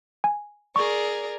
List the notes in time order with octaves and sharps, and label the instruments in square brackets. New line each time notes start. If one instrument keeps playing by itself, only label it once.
[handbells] G#5
[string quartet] G#4 A#4 D5 [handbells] C#6